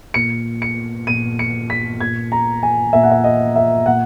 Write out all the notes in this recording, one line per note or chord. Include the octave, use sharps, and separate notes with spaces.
A#2 C#7
C#7
A#2 D#7
C#7
B6
A#2 G#6
A#5
G#5
A#2 E5
F#5
E5
D#5
E5
A#2 F#5